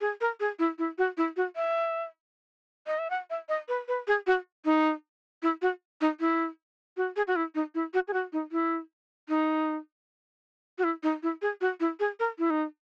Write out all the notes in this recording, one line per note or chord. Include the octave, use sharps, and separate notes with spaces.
G#4
A#4
G#4
E4
E4
F#4
E4
F#4
E5
D#5
E5
F#5
E5
D#5
B4
B4
G#4
F#4
D#4
E4
F#4
D#4
E4
F#4
G#4
F#4
E4
D#4
E4
F#4
G#4
F#4
D#4
E4
D#4
F#4
E4
D#4
E4
G#4
F#4
E4
G#4
A#4
E4
D#4